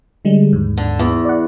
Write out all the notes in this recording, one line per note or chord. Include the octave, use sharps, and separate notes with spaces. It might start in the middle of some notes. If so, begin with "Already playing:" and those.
D3 G3 G#3
D#2 G#2
D3
E2
D5 F#5